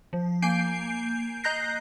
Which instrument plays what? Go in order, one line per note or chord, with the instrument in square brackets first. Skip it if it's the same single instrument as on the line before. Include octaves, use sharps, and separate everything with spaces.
[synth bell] F3
A#3 G#5 G6 C7 D7
D#5 A#5 F#6 G6 A#6 C7